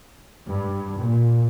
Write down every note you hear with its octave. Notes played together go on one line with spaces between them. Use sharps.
G2
A#2